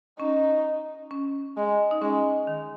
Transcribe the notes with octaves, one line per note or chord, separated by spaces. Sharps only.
C#4 D#4
C#4
G#3
D#4
G#3 C#4
D#3